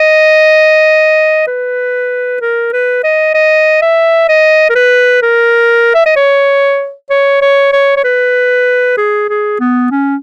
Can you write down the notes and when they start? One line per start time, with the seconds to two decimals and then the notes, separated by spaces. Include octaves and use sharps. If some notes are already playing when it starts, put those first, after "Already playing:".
Already playing: D#5
1.47 B4
2.41 A#4
2.73 B4
3.04 D#5
3.35 D#5
3.82 E5
4.29 D#5
4.70 A#4
4.75 B4
5.22 A#4
5.95 E5
6.06 D#5
6.16 C#5
7.10 C#5
7.42 C#5
7.73 C#5
7.97 C#5
8.04 B4
8.98 G#4
9.29 G#4
9.60 B3
9.92 C#4